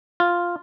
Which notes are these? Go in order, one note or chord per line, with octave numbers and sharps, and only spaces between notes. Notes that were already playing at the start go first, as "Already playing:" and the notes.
F4